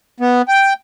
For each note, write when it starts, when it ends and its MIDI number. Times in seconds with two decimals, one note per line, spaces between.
0.20 0.42 59
0.48 0.73 79